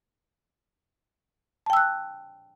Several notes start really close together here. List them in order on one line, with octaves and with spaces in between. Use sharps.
A5 G5 E6 F#6